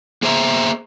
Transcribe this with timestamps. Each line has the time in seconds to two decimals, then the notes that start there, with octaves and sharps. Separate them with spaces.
0.23 A#3 G#4 C5 E5 A#5